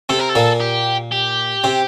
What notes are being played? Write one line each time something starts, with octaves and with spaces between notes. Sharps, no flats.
C3 C4 A4
A#4
A4
A#2 A#3
G4
G4
C3 C4